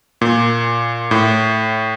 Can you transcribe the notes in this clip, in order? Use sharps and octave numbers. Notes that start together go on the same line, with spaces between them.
A#2
A2